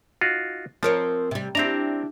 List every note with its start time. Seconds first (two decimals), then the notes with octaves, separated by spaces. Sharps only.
0.21 D#4 F4 F#4
0.83 F3 C4 A#4 C#5
1.31 C3 G3
1.55 C4 D4 E4 G4 A#5